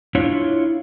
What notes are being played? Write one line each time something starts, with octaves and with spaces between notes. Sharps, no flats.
D4 E4 F4 C#5